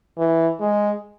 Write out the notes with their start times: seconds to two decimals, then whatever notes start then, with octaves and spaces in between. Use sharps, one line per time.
0.18 E3
0.60 G#3